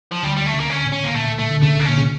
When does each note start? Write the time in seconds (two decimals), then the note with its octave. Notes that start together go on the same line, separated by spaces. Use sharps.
0.12 F3
0.23 D2 D3 G3
0.37 G3
0.47 A3
0.54 C#2 C#3
0.60 A#3
0.70 C#4
0.85 A2
0.92 C#4
1.04 A#3
1.15 A#2 A3
1.38 A3
1.51 D3
1.62 C#2 C#3 A3
1.79 A#3
1.85 A#2 C#4
1.98 C#3